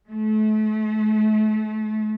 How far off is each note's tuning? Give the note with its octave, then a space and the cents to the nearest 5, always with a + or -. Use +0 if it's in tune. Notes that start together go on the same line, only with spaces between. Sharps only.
A3 -35